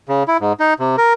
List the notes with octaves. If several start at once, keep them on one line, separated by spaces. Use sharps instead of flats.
C#3
E4
G#2
D#4
C3
A#4